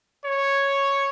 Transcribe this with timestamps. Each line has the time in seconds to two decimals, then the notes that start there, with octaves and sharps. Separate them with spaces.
0.25 C#5